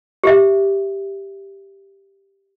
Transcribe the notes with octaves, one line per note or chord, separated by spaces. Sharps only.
G4 E5